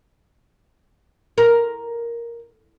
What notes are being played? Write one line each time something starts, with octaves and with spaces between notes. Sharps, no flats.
A#4